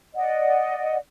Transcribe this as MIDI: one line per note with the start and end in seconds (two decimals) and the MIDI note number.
0.15 0.97 74
0.15 0.97 75
0.15 0.97 78